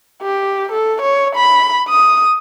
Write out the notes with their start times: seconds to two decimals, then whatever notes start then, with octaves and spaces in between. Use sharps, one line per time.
0.22 G4
0.72 A4
1.02 C#5
1.36 B5
1.89 D#6